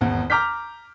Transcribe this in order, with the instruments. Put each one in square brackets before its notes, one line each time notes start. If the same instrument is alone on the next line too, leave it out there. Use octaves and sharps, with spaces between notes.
[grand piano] G#1 E2
A#5 D6 F6 G6 B6